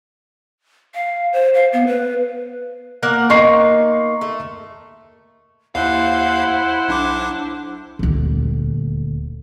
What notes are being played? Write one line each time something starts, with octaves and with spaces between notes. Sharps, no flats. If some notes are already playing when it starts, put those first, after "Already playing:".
F5
C5
F5
B3
B4
A#3 A#4 F#5
A#3 D#4 C6 C#6 C7
A3
D#2 E4 C5 F5 F#5
B1 D4 D6
D#1 D2